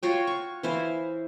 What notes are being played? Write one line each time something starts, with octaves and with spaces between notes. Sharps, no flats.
F4 F#4 C#5 G5
C#6
E3 E4 C5 F5